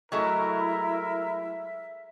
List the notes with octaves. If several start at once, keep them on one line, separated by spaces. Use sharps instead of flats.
F#3 G#3 A3 E4 A#4 E5